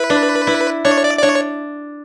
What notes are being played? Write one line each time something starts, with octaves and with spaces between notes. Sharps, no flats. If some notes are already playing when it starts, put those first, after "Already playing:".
Already playing: E4 B4
D4
E4
D4 C#5
D5
D5
D4 C#5